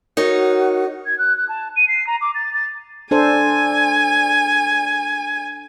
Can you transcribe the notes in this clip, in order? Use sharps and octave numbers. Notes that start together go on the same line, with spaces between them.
D#4 F#4 A#4 C#5
G#6
F#6
F#6
A5
D#7
C7
A#5
D6
A6
A6
D4 A4 C5 G#5